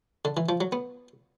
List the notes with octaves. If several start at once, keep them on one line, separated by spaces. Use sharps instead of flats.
D3
E3
F3
F#3
B3